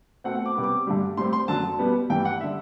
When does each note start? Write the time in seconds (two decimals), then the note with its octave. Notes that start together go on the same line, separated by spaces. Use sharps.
0.24 B2 A3 C4 F#5
0.35 F#5
0.46 D6
0.55 C3 G3 B3
0.64 D6
0.87 G2 D3 G3
1.17 A2 G3 C4 C6
1.33 C6
1.48 F#2 D3 F#3 A5
1.79 B2 G3 B3
2.10 G2 E3 G3 G5
2.25 F#5
2.41 D3 G3 E5